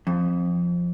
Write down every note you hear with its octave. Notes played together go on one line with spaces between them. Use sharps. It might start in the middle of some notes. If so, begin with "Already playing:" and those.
F2